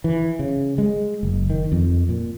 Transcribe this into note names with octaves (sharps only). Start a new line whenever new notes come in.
E3
C#3
G#3
F#1
D#3
F2
A#2